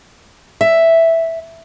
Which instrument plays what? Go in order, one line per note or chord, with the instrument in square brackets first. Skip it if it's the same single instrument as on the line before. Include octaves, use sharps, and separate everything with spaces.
[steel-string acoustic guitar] E5